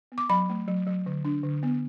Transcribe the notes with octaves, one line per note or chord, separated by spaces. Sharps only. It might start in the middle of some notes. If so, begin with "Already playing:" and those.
B3
D6
F#3 B5
A3
F#3
F#3
D3
D4
D3
B3